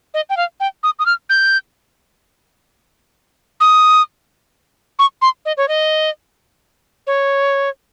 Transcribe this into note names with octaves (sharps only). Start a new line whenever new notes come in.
D#5
G5
F5
G5
D#6
D#6
F6
G6
D#6
C#6
C6
D#5
C#5
D#5
C#5